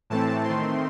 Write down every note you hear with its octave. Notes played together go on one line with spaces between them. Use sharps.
A2 E3 A3 C4 A5
D#3 A3 C4 C6